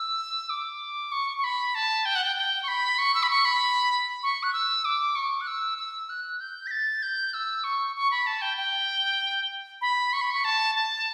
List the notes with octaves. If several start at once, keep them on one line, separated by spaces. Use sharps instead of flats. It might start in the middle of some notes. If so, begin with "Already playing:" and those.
Already playing: E6
D6
C#6
C#6
B5
A5
G5
F#5
G5
G5
C#6
B5
C#6
E6
B5
C#6
B5
C#6
F#6
E6
D6
C#6
F#6
E6
E6
F#6
G6
B6
A6
G6
E6
C#6
C#6
B5
A5
G5
G5
B5
C#6
B5
C#6
A5
A5